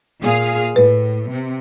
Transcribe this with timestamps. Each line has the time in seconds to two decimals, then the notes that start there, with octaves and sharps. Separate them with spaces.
0.21 A#2 G#4 F5
0.76 A2 B4
1.30 C3